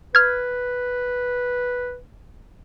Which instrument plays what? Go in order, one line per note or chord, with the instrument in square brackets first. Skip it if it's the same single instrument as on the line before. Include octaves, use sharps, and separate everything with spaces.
[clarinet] B4 [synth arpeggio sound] F6 G#6